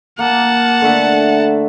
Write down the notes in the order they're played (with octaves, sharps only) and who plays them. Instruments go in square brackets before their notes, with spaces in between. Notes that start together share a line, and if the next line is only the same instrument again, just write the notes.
[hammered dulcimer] A#3 [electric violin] F#5 A5
[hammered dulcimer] D3 A3 E5